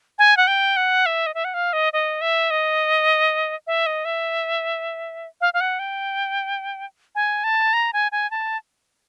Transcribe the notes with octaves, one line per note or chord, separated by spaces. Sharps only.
G#5
F#5
G5
F#5
E5
D#5
E5
F#5
F5
D#5
D#5
E5
D#5
E5
D#5
E5
F5
F5
F#5
G5
G#5
A5
A#5
G#5
G#5
A5